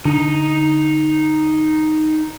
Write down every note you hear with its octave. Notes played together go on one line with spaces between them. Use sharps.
D3 D#4 A#5